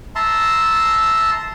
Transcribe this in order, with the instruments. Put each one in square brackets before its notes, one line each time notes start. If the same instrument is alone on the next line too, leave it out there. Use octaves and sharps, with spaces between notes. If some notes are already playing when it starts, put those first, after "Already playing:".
[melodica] E5 A5 A#5 C6